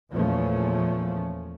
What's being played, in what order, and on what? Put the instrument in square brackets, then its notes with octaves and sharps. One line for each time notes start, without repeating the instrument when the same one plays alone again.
[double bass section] E2 A#2 F3 A3 C#4